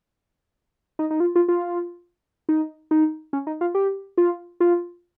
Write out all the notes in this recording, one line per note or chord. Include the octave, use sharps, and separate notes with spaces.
D#4
D#4
F4
F4
F4
D#4
D#4
C#4
D#4
F4
G4
F4
F4